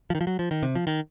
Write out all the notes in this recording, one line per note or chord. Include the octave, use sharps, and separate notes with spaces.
F3
D#3
F3
F#3
F3
D#3
C3
F3
D#3